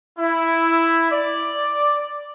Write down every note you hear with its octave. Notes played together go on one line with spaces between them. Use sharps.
E4
D5